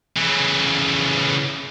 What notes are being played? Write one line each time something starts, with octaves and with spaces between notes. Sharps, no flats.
C#3 E3